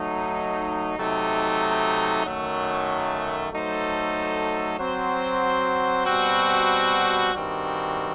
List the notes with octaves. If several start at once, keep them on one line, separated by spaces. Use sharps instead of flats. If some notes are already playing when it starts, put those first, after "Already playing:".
Already playing: F#3 A3 D#4
C3 F#3 A3 D#4
F#2 D#3 F#3 A3
F#3 A3 D#4 A4 C5
F#3 C4 F#4 C5
B2 G3 C4 F#4
G2 D#3 G3 C4 F#4